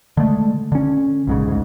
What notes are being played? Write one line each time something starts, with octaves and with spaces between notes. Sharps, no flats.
D3 G#3 A3
D3 C#4
A#1 G#2 C#3
D2 G#2